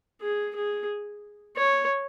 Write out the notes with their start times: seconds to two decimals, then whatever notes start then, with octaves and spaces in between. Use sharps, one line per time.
0.21 G#4
0.55 G#4
1.56 C#5